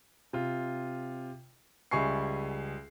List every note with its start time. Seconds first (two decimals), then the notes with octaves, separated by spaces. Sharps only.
0.33 C3 F4
1.91 C#2 G3 E5 G#5 C#6 C7